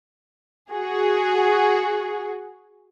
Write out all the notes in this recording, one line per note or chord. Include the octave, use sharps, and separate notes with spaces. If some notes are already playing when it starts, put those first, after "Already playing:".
F#4 G#4